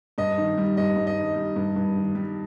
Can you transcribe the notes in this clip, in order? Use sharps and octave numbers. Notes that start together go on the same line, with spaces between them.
G2 D#5
D#3
G3
G2 D#5
G2
D#5
D#3
G3
G2
G2
D#3
G3